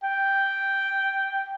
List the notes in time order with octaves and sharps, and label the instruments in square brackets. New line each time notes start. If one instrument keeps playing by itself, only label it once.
[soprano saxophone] G5